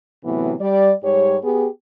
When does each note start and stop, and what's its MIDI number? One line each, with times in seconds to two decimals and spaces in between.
0.24 0.53 45
0.24 0.53 48
0.24 0.53 52
0.24 0.53 54
0.24 0.53 59
0.60 0.92 55
0.60 0.92 74
1.03 1.37 44
1.03 1.37 55
1.03 1.37 67
1.03 1.37 73
1.43 1.66 59
1.43 1.66 67
1.43 1.66 68